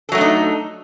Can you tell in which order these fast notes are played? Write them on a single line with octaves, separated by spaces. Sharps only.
A4 F#3 A3 D4 D#4